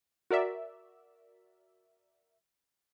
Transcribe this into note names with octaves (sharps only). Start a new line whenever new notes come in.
F#4 A#4 D5 E5